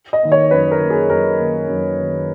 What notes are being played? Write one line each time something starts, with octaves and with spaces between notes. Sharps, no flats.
D#5
D#3 A#3
C#5
F#2 B4
A#4
D#3 A#3
G#4
F#2 A#4
D#3 A#3
F#2
D#3 A#3